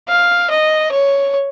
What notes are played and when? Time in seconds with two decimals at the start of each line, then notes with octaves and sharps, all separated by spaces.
0.09 F5
0.50 D#5
0.92 C#5